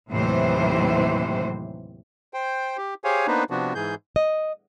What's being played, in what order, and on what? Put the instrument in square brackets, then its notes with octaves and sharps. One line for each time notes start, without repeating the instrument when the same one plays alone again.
[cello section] D#2 A2 C3 E3 F#3 C5
[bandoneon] C5 G5
G4
G4 G#4 C5 C#5 F5 G#5
A#3 B3 D4 D#4 B4 C5
C3 F3 B3 D4 F#4
G#2 E3 G#4 G6
[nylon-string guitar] D#5